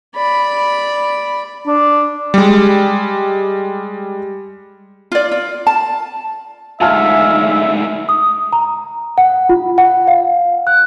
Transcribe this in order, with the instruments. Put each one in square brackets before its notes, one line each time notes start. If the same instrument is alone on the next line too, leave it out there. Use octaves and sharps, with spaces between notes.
[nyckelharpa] D5 B5
[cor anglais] D4
[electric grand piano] G3 G#3
[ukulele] F4 D5
F4
A5
[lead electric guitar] D2 G#2 [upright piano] F4 G#5 F6 [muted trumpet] E5
[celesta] D#6
A#5
F#5
F4
F#5
F5
F#6